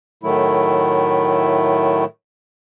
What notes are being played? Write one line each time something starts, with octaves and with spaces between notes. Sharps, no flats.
A2 D#3 F#3 A3 E4